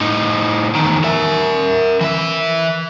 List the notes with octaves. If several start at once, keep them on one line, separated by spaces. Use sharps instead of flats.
A2 D#4
E2 D#3
A#4 E5
E3 E5